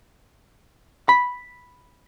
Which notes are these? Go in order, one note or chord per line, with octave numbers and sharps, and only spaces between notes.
B5